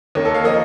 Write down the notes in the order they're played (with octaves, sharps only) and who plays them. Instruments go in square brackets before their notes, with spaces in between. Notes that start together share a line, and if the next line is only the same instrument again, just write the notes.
[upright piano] D#2 D#3 A#3 C#5
A4
F5
F3 A#3 D#5